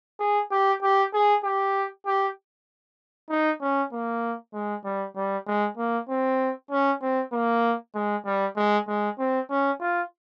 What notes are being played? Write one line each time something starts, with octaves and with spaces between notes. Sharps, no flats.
G#4
G4
G4
G#4
G4
G4
D#4
C#4
A#3
G#3
G3
G3
G#3
A#3
C4
C#4
C4
A#3
G#3
G3
G#3
G#3
C4
C#4
F4